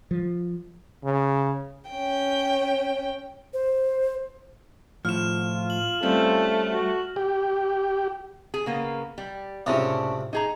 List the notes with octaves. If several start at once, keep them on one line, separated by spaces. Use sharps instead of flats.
F3
C#3
C#4 G5
C5
A2 F3 F6 E7
F4
F#7
G3 A3 C4 C#4
F#4
G4
G#4
C#3 A#3 B3
G3
C#2 A2 C3 C#4 D4 C#5
D#4 G#4 A#5